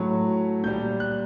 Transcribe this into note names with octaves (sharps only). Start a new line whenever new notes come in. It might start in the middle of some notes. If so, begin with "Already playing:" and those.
Already playing: A2 F#3 A3
A#2 G3 G6
F#6